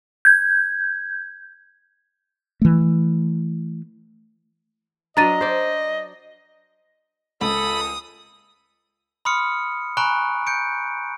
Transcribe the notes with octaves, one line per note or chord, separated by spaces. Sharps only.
G6 G#6
E3 A3
F#3 D4 D#5 A#5 A6 D#7
C5 D5
C#2 A4 B5 D#6
B5 C6 D#6 F6 C#7
G#5 A#5 B5 C#6 F#6 D7
G6 C#7 D7